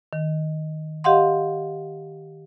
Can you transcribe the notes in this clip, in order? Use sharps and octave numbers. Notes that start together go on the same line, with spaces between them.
D#3
G4 D#5 F5 F#5 C6